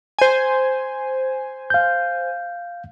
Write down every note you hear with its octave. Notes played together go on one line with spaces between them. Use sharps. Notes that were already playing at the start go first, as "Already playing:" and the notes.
C5 G#5
F5 G6